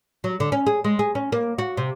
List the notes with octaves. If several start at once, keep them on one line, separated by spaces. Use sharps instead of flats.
F#3
D3
C#4
G#4
G#3
G#4
C#4
A#3
F#4
C3